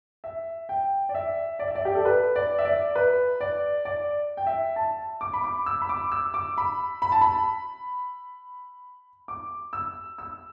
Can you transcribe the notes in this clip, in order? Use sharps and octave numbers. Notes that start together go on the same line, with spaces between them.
E5
G5
D5
E5
D5
E5
D5
G4
A4
B4
D5
E5
D5
B4
D5
D5
G5
E5
A5
D6
B5
D6
E6
B5
D6
E6
D6
B5
B5
A5
B5
D6
E6
E6